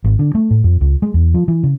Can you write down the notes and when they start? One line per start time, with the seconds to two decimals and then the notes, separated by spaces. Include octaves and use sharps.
0.04 G#1
0.19 D3
0.35 A3
0.51 A2
0.64 F2
0.81 C#2
1.02 G#3
1.14 E2
1.34 F3
1.48 E3
1.63 C#3